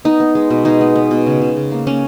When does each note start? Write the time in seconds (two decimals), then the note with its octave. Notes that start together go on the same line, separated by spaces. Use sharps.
0.05 B3 D#4
0.20 B3
0.35 G#3
0.50 B2
0.65 G#3 D#4
0.81 B3
0.96 B3
1.11 B2
1.27 C#3
1.41 C#3
1.56 C#3
1.72 A#3
1.87 A#3 C#4